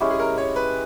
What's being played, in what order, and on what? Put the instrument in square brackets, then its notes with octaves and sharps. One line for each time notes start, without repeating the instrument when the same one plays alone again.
[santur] G#3 C#4 E4 G4
[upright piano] G#4
A#4
C#5
B4